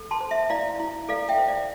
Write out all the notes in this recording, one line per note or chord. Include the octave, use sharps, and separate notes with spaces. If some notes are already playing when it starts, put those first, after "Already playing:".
Already playing: A4
A5 C6
C5
E5
E4 D5 F5
E4
A4 D5 F5
E5 G5
C5
D5 F5